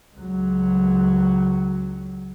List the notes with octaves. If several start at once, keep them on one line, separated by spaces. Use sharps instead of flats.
C#2 F#3